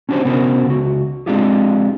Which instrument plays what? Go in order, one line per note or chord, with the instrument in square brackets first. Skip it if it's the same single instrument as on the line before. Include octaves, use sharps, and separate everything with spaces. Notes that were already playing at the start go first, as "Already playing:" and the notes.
[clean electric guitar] C#4 D4 F#4 G4 C5 C#5
C3 B3 C#4 F#4 A#4 C5
C#2 F#4
G#3 C4 D4 F4 G4 G#4